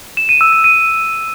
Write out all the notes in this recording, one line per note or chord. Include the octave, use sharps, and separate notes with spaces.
E7
D#7
E6
D#7
D#7